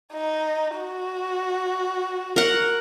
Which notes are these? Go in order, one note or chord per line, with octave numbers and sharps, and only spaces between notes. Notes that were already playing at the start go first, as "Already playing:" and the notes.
D#4
F#4
A#4 F#5